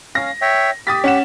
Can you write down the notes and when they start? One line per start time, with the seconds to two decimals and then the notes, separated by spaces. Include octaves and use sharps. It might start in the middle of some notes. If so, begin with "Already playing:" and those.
0.15 C#4 F5 A#6
0.41 C#5 E5 G5
0.87 G4 D#6 A6 B6
1.04 C#4 F#5 E7